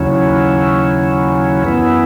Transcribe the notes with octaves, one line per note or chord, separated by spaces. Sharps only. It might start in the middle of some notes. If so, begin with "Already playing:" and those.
Already playing: D#2 C#3 F#3 C#4 E4
F#2 E3 B3 E4